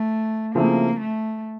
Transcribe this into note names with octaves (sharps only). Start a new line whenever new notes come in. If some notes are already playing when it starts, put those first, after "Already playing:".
Already playing: A3
C#3 F3 A3 A#3 C4 E4
A3